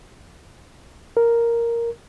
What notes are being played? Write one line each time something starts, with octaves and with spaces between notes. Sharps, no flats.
A#4